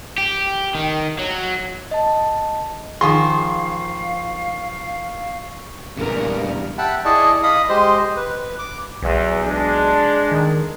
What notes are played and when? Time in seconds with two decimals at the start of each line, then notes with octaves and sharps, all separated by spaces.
0.18 G4
0.75 D#3
1.19 F#3
1.91 D#5 A5
3.01 D#3 F3 G#4 F5 C6 C#6
5.98 E2 G2 A#2 C#3 B3 A#4
6.78 E5 F#5 G5 A5 B5
7.05 E4 G#4 D5 D#5 A5 C#6
7.43 D#5 F5 B5 D#6
7.69 G#3 G4 C5 D#5 C6
8.16 B4
8.59 D6
9.02 B1 E2
9.44 G#3 D4
10.32 D#3